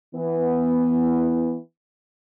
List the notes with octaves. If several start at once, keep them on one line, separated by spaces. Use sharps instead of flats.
E3 B3